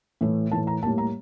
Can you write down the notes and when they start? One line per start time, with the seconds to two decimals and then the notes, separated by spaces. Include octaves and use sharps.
0.21 A2 E3 A3
0.51 A2 E3 A3 A5
0.67 A#5
0.83 A2 G3 A#3 A5
0.98 A#5